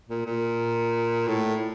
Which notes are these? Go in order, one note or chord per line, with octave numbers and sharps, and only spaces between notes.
A#2
A#2
A2